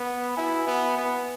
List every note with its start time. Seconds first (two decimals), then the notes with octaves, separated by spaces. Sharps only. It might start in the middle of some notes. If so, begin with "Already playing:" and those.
Already playing: B3
0.37 E4 F#4 E5 G#5
0.67 B3
0.97 B3